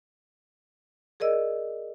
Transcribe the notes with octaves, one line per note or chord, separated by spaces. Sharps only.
G#4 A#4 D5 D#5 E6